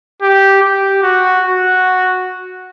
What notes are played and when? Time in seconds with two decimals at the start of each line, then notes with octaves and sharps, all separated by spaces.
0.22 G4
0.62 G4
1.03 F#4
1.45 F#4